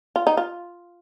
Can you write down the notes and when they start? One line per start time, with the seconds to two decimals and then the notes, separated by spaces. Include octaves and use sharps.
0.16 F4
0.27 D#4
0.37 F4